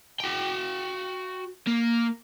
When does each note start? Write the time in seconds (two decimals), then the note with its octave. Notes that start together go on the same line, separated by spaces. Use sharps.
0.20 F#4 G5
1.67 A#3